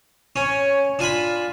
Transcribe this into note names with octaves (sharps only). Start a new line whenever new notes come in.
C#4 C#5
D4 F4 G#5 B5